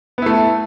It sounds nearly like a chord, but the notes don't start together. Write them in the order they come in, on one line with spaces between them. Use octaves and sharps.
B3 E4 A3